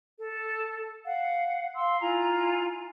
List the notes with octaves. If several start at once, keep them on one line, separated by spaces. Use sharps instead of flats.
A4
F5 F#5
F5 C6 E6
E4 F4 G#5 A#5